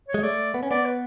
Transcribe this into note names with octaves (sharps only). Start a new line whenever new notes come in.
C#5
G#3
A3 D5
B3
C#4
B3 D5
B4